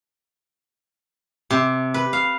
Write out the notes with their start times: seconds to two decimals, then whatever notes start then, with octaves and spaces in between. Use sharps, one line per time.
1.51 C3
1.94 B4
2.13 F5